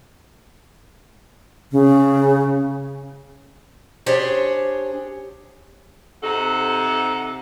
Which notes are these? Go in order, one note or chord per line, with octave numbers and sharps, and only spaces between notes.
C#3
D4 G4 G#4 C5 C#5
C3 D#4 A4 F#5